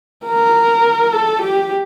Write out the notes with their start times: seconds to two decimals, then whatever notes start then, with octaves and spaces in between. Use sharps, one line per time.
0.26 A#4
1.13 A4
1.42 G4